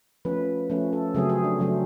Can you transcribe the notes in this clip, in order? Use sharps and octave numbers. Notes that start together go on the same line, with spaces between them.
F3 A3 C#4 B4
F3 A3 C#4
A4
C#3 F#3 A3 C4 G#4
G#4
D4
C#3 F#3 A3 C4